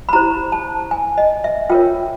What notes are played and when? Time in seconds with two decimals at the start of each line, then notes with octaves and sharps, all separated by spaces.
0.09 B5
0.13 E4 G4 C5 A#5
0.52 A5
0.91 G#5
1.18 D#5
1.44 E5
1.70 F4 A#4 C#5 G5